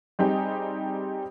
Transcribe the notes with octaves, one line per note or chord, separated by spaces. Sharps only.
G3 C4 D#4 G4 G#4